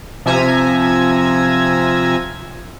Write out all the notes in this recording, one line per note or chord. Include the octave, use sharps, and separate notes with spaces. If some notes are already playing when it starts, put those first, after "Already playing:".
C3 F3 E5 G#5 A#5 G#6